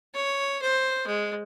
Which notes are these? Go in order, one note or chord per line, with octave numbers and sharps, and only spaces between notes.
C#5
C5
G#3